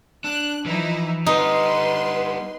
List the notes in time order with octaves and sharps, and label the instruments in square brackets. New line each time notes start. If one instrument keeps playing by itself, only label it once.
[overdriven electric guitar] D4 [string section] F#6
[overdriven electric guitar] E3 [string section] F3 D#4 E4
[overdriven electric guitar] G3 B3 [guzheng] D#4 [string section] B4 C6